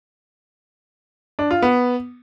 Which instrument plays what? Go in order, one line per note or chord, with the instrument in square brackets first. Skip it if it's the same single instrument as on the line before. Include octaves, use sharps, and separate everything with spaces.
[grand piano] D4
F4
B3